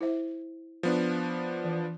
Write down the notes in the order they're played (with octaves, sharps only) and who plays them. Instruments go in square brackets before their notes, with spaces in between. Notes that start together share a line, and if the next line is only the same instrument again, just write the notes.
[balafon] E4 C5 E5
[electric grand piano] F3 B3 D4
[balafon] E3